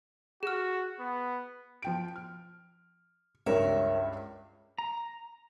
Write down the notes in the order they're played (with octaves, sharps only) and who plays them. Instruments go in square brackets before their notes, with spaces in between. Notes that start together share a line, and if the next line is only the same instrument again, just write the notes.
[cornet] F#4 [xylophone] G#4 F6
[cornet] B3
[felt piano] F3 G5 D7
F6
[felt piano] C#2 G2 G3 [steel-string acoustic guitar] A#4 C#5 E5
[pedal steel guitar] A#5